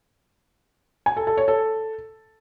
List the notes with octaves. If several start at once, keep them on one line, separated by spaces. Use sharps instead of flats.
G#5
A4
A4
C#5
A4